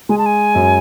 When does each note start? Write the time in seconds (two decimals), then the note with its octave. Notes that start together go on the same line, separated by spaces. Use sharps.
0.09 G#3 G#5
0.18 A5
0.26 G#5
0.55 F#2